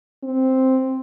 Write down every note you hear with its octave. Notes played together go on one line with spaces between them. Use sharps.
C4